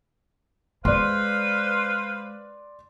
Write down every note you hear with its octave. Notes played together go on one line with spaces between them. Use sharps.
G#3 B4 C5 D5 F5 C6